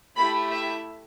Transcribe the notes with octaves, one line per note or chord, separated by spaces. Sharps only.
A3 E4 G4 B5
E5